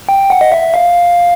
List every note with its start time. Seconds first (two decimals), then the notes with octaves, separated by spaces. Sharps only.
0.09 G5
0.30 F#5
0.41 D#5
0.52 E5
0.74 F5